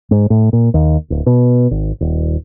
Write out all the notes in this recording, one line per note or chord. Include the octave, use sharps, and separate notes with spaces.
G#2
A2
A#2
D#2
D1
B2
G#1
D#1